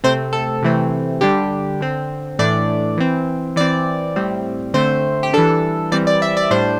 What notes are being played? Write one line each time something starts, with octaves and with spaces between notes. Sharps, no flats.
C3 A3 C4 C5
A4
C3 E3 A3 C4
D3 G3 D4 G4
D3 C4
A2 E3 A3 D4 D5
E3 C4
E3 C4 D5
A2 G3 C4
D3 A3 C4 C5
G4
E3 G3 D4 A4
E3 G3 C4 D5
D5
E5
D5
A2 G3 D4 C5